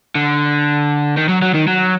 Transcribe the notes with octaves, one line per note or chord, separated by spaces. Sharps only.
D3
D#3
F#3
F#3
D#3
F#3